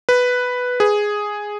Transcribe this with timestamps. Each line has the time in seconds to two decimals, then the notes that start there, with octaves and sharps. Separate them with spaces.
0.09 B4
0.80 G#4